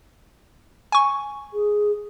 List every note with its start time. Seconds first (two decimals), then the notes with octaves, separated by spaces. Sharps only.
0.92 G#5 C#6
1.54 G#4